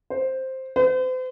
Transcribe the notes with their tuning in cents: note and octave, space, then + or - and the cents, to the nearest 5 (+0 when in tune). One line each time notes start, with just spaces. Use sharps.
C5 +5
C5 -40